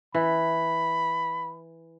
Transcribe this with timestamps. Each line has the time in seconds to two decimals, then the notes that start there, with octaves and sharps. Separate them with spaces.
0.14 E3 B5